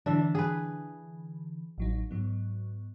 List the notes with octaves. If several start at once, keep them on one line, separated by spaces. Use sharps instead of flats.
D3 E3 D4 E5
G#4 B4
A1 F#3 D#4
G#2 F#3 B3